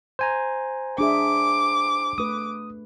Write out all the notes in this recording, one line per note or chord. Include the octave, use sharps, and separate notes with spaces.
C5 G#5 A#5
D4 G#4 E5 D6
A3 B4 D#6